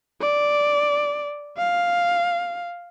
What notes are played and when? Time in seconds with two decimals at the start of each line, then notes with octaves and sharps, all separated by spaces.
0.21 D5
1.58 F5